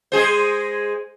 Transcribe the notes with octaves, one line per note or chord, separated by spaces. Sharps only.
G#3 G#4 C5